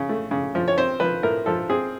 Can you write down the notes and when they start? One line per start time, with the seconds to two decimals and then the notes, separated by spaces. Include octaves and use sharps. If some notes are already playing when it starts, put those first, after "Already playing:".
Already playing: C#3
0.09 A3
0.31 C#3
0.55 F3
0.68 C#5
0.77 C4 C5
1.00 F3 B4
1.23 A2 A#4
1.46 F3 A4
1.70 C4 G#4